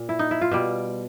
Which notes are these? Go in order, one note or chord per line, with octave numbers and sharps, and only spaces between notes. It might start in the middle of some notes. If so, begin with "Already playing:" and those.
Already playing: A#2
E4
D#4
E4
F4
B2 G3